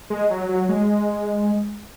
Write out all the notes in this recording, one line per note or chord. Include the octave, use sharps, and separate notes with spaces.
G#3
F#3
F#3
G#3